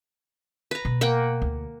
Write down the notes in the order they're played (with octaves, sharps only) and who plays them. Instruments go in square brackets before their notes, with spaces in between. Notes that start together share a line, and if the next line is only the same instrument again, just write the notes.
[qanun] B4 A#5
[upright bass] B2
[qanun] A#3 F#5 G5
[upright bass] D2